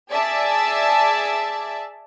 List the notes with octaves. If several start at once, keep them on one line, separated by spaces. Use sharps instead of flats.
G#4 D5 E5 A5